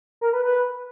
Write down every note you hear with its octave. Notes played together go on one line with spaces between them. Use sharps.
A#4
B4
B4